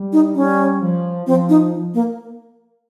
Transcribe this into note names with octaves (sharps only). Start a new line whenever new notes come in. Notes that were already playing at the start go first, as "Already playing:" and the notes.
Already playing: G3
D#4
G3 C#4
F3
F3 C4
D#4
A#3